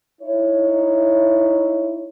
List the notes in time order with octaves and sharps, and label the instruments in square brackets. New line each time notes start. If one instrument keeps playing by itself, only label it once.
[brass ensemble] D#4 E4 C#5